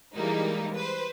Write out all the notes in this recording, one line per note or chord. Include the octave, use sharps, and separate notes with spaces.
E3 G3 G#3 A#3 D#4
B4 C5